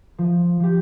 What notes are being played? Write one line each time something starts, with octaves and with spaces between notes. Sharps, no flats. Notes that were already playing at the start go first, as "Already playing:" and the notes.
F3
F3 G4